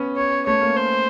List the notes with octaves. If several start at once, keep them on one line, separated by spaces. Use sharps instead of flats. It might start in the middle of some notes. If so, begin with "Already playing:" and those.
Already playing: B3 C#4
C#5
A3 C#5
A#3
C5